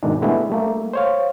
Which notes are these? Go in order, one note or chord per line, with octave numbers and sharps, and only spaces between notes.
G#2 B2 D#3 G#3 D4
G#3 A3 B3 D4 E4 G4
G3 A3 A#3
C5 C#5 F5